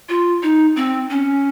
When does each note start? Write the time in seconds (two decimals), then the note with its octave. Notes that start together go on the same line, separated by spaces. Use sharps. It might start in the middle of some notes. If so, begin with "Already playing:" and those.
0.09 F4
0.43 D#4
0.76 C4
1.10 C#4